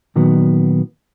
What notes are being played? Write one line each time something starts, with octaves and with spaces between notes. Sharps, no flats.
A#2 D#3 F#3 B3